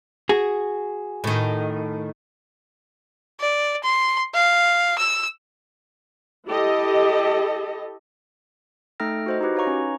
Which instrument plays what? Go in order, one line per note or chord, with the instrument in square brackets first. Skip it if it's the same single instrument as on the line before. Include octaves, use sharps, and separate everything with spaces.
[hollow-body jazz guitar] F#4 G#4
[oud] A2 D#3
[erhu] D5
C6
F5
E6
[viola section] E4 G4 A4 D#5
[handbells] A3 D#4 A4 G5 F6 A#6
F#4 C5 D#5
D#4 E4 F#4 G4 B4
D#4 B4 C#5 F5 A#5 C#6
C#4